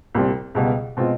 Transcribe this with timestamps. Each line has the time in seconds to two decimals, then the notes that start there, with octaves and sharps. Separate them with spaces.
0.15 C2 A#2 G3 C4
0.55 C#2 B2 G3 B3
0.97 B2 G#3 C4 F4